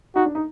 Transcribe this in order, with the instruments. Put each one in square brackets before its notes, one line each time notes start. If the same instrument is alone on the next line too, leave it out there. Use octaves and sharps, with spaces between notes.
[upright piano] D#4 [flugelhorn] F#4
[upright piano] D4
D#4